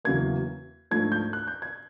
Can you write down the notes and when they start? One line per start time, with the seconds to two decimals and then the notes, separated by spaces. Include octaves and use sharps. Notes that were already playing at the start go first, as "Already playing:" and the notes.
0.04 E2 C#3 F#3 A#3 G#6
0.91 G#2 F3 A3 D4 G#6
1.12 G6
1.33 F#6
1.47 G6
1.62 G#6